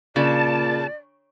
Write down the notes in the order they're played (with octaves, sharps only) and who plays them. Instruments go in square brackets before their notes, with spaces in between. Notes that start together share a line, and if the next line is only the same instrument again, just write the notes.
[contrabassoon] A#2 [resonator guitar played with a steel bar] C#3 [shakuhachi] D5 [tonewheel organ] A5